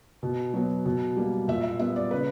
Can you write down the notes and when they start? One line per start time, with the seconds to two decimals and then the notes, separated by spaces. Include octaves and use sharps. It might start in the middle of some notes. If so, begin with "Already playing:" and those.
0.23 B2
0.54 F#3 B3
0.86 B2
1.16 G3 A#3
1.48 A#2 E5
1.63 E5
1.79 G3 B3 E5
1.96 D5
2.11 C#3 B4